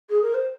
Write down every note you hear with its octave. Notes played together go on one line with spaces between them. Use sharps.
G#4
A#4
C5